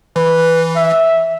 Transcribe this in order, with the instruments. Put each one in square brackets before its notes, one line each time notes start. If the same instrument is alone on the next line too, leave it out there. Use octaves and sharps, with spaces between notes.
[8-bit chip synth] E3 [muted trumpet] B4
[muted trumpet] E5